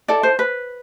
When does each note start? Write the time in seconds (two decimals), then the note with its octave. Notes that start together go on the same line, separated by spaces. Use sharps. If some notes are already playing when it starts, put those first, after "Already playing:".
0.08 E4 A4 D5
0.23 C5
0.39 B4